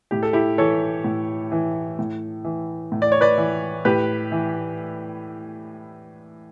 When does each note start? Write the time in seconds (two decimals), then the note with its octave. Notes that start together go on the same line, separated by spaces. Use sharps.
0.11 A2 G4
0.23 A4
0.33 E4 G4
0.58 E3 A4 C#5
1.04 A2
1.52 E3
1.99 A2
2.44 E3
2.92 A2
3.02 D5
3.12 C#5
3.21 B4 D5
3.38 E3
3.85 A2 G4 B4
4.32 E3